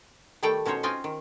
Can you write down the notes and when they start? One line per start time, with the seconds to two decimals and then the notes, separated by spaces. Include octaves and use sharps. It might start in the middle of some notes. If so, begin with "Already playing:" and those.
0.43 D#3 G3 A3 A4 D5 G5
0.66 B2 C#4 D#4 C5 C#5
0.83 C4 C#4 F4 D#5 G5 G#5
1.04 D#3